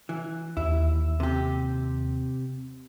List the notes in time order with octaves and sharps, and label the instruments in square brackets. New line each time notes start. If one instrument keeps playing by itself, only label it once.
[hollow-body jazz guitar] E3
[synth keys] D#2 [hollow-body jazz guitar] E4
[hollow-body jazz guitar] C3 G4